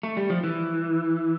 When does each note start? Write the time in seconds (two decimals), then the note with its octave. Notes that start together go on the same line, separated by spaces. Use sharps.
0.03 A3
0.17 G3
0.30 F3
0.44 E3